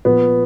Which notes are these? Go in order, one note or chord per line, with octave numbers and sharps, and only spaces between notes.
A#2 F3 B3